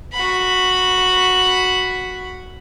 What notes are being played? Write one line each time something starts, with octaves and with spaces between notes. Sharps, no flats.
F#4 B5